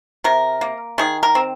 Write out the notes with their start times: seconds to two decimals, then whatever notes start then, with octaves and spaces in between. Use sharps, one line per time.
0.24 C3 A#4
0.61 A#3
0.98 D#3 G#4
1.23 A#4
1.35 C4